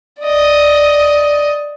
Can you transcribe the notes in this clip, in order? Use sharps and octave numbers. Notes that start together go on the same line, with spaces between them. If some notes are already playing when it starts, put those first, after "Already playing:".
D5 D#5